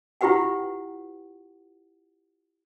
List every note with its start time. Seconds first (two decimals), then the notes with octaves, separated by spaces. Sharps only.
0.21 E4 F4 G4 B4 F#5 G5